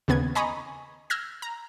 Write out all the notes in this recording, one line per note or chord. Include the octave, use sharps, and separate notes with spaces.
D#2 C#3 B3 G#6
D#5 G#5 A#5 B5 C#6 D#6
E6 F6 G6 G#6 A#6
A#5